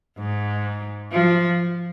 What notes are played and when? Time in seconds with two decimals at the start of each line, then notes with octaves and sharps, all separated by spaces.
0.18 G#2
1.12 F3